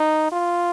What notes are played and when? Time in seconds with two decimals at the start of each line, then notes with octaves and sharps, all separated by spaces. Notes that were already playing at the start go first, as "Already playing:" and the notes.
Already playing: D#4
0.32 F4